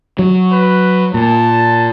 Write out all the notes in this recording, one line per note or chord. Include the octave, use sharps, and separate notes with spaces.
F#3
B4
A#2 A5